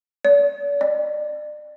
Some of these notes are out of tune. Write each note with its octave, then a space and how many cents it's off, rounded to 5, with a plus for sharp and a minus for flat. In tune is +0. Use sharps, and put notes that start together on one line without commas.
D5 -45
D5 +35